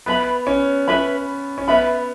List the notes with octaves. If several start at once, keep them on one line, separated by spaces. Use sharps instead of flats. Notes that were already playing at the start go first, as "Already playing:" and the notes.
B3 B4 E5 B5
C#4
C#4 B4 E5 B5
C#4
B3 B4 E5 B5